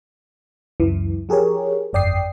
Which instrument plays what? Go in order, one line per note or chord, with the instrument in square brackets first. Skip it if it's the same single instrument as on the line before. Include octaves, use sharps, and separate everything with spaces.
[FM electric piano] C#2 F#2 E3
F3 G4 G#4 A#4 C#5
G1 F2 D5 G5 D#6 C7